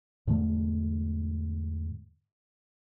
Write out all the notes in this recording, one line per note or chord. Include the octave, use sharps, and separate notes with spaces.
E2 G#2 D3 A3